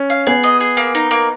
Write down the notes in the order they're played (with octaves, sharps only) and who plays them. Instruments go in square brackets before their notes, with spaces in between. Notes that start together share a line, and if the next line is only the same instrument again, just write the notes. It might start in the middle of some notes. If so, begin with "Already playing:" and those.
Already playing: [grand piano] C#4
[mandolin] F5
[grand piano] B3 [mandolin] G#4
[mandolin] D#5
G#4
A#3
D#4
A#3